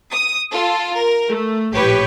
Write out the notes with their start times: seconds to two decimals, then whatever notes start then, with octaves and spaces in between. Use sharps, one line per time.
0.12 D#6
0.51 F4 A4
0.95 A#4
1.29 A3
1.73 A#1 A2 G4 B4 C#5